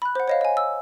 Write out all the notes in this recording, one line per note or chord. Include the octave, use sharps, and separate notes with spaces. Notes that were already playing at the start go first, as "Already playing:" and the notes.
B5 F#6
C5 F#5
C#5 D#5 F5
D#5 G#5
E6